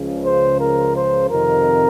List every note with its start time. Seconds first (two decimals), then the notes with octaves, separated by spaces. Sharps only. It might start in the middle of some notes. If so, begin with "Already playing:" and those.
Already playing: C#2 C#3 F3
0.24 C5
0.60 A#4
0.95 C5
1.30 F2 C3 D#3 A#4